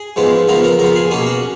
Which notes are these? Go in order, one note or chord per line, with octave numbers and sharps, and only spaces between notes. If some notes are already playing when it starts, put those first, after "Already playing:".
Already playing: G#4
G#2 F3 G#3 B3
C#3 F3 B3 A#4
A#4
C#3 F3 B3 A#4
G#4
B2 A#3 C#4 G#4
F#4